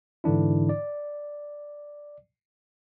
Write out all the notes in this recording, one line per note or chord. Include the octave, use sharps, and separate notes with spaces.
G#2 D3 E3 D4 E4
D5